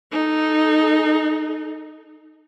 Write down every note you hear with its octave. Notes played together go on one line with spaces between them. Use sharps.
D#4 A4